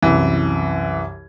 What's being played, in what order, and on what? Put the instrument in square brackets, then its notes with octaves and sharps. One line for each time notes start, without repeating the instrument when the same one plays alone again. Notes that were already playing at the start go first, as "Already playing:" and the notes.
[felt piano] C2 F#2 [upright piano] E3